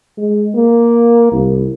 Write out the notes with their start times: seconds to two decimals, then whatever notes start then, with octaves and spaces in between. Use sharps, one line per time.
0.18 G#3
0.55 A#3
1.32 C2